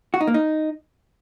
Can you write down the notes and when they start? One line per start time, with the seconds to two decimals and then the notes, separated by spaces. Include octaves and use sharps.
0.14 F#4
0.21 D#4
0.27 A#3
0.34 D#4